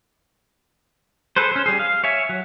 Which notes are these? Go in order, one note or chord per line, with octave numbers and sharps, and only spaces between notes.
G#4 A4 B4 C5
C#4 C5
G3 G#4
F5
C#5 E5 G#5
F#3